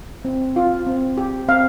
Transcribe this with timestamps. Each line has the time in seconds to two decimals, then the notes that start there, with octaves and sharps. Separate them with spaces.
0.25 C4
0.56 F4
0.87 C4
1.17 G4
1.48 C4 F5